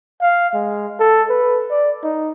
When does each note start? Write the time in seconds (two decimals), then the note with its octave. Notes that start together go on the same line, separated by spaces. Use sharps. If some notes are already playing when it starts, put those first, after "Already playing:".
0.21 F5
0.54 G#3
1.00 A4
1.30 B4
1.71 D5
2.03 D#4